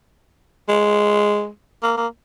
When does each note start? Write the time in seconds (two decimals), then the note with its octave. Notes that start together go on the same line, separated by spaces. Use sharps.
0.68 G#3
1.83 A#3
1.97 A#3